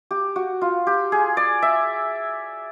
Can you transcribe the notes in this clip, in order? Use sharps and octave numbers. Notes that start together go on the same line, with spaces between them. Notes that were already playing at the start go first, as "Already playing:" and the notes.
G4
F#4
F4
G4
G#4
D5
E5